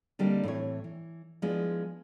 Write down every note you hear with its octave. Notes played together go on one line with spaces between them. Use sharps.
D3 G3 A#3 C4 D4 D#4
A2 E3 C4 C#5
E3
F3 G#3 B3 D4 E4